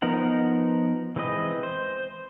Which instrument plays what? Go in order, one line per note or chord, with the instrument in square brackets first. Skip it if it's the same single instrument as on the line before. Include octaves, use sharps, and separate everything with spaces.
[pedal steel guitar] F3 B3 D#4 A#4 F#5
E3 G#3 C4 B4 D#5
C5